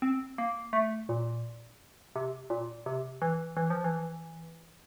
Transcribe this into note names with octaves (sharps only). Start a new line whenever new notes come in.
C4
A#3
A3
A#2
C3
A#2
C3
E3
E3
F3
E3